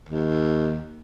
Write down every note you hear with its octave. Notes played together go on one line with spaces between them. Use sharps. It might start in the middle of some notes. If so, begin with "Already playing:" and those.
D#2